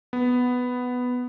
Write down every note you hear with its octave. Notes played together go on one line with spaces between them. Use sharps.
B3